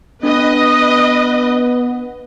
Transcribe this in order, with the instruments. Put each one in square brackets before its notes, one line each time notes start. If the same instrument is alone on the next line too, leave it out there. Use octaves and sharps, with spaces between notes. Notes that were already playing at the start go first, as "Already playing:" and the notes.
[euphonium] B3 [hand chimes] D4 [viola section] B4 D#5